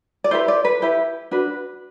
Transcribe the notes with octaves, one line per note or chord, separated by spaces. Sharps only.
D5
E4 G4 B4 C5
D5
B4
E4 G4 B4
D4 F#4 B4